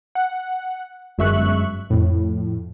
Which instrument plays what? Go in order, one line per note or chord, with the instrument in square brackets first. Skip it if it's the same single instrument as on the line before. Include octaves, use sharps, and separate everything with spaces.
[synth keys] F#5
G1 F#2 G#3 E5 C#6 F#6
F2 A2